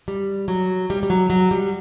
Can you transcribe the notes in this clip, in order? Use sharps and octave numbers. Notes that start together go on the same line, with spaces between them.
G3
F#3
G3
G3
F#3
F#3
G3